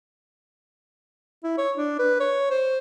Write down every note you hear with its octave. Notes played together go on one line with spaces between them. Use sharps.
E4
C#5
D4
B4
C#5
C5